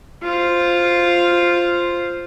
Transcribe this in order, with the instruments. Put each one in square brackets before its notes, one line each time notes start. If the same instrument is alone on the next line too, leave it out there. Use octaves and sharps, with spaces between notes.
[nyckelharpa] F4 C5